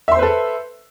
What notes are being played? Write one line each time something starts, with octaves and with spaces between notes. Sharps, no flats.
A4 B4 C5 E5 C6